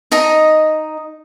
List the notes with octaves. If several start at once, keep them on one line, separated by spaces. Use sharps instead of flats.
D#4 D#5 A#5